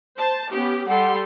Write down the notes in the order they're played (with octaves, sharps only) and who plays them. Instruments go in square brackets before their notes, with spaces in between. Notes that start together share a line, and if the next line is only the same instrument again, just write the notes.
[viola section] C5 A5
B3 C#4 G4
[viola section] G3 A4 C6 [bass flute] F#5